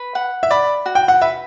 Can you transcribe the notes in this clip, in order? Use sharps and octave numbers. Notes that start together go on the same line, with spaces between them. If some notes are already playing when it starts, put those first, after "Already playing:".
Already playing: B4
F#5
E5
D5 B5
F#4
G5
F#5
B4 E5